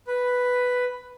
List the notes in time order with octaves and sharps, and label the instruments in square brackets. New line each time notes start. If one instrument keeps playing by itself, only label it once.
[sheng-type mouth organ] B4